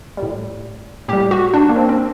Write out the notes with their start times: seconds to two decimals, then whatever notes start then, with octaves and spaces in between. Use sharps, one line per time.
0.17 G3
0.23 A2
1.08 A2 G3 G4
1.31 F#4
1.53 D4
1.69 A#3
1.76 C4
1.89 C4